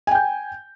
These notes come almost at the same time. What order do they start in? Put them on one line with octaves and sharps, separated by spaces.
G#5 G5 G6